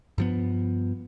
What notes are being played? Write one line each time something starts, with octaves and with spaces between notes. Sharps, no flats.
G2 F3 B3